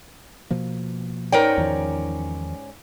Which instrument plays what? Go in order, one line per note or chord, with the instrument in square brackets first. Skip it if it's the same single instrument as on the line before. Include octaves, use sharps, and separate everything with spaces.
[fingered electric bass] B2 F3 A#3
[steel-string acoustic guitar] G#2 C#4 D5 [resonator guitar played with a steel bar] A#4 G5
[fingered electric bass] E2 D#3 F3